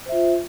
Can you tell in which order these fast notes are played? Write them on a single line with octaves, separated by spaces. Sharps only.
C5 E5 F4